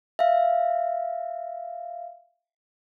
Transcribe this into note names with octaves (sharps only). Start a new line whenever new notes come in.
E5 F5